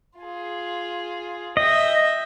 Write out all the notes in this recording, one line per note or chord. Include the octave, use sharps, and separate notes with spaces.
F4 G#4
D#5 E5 G5